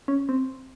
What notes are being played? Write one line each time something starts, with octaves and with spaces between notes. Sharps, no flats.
C#4
C4